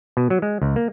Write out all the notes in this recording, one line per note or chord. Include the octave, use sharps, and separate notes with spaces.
B2
F#3
G#3
C#2
A#3